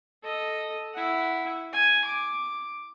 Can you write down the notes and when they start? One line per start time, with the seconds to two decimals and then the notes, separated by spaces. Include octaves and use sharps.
0.23 A4 D#5
0.94 E4 F#5
1.72 G#5
2.05 D6